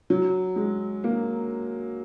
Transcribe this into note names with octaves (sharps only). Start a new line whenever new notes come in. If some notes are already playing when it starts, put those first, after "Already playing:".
F#3
G#3
A#3